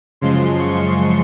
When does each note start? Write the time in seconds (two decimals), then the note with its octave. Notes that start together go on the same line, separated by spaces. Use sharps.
0.21 F#2 C#3 F3 G#3 C6
0.59 C#6